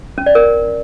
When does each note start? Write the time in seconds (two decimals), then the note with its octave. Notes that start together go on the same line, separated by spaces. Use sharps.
0.18 C#4
0.26 D5
0.35 A#4